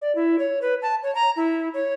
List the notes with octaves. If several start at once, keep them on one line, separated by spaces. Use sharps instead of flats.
D5
E4
C#5
B4
A5
C#5
A#5
E4
C#5